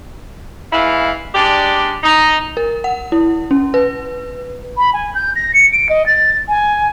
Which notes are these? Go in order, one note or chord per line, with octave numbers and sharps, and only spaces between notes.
E3 G#3 E4 F5
G#3 D4 G4 D5
D#4
A#4
F#5
E4
C#4
B4
B5
G#5
G6
A#6
C#7
D7
D#5
A6
G#5